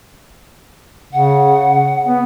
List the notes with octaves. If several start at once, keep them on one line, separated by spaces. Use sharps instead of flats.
C#3 F#5
B3